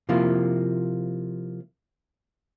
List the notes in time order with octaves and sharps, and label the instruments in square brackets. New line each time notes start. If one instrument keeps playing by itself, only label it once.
[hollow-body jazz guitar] C3 F3 A#3 E4 F4